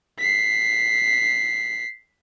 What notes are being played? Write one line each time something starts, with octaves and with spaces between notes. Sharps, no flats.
B6 C7